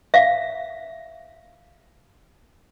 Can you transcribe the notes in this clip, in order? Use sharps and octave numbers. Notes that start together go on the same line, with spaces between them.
E5 F5